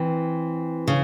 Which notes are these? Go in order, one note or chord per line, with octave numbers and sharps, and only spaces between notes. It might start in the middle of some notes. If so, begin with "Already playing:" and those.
Already playing: E3 C4
C#3